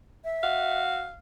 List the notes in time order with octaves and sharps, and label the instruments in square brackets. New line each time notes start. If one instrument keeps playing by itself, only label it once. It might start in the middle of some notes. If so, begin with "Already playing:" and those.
[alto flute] E5
[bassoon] F#4 [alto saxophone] F5